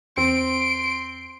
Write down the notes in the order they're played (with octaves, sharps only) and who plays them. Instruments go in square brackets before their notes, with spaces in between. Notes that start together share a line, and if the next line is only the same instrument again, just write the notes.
[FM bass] E2 [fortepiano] C4 [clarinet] C6 [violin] D7